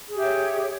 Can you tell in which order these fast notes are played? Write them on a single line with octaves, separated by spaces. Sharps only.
G#4 G4 E5 C#5